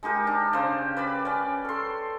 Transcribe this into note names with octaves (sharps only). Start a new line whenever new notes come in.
G#3 D#4 G4 A#4
D4
C#3 C5
B4 D5 B5
C#4 D5
A4 C6